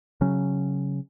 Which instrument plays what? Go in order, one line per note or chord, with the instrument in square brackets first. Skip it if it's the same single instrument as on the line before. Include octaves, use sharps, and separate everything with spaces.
[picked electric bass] C#3 F#3 C#4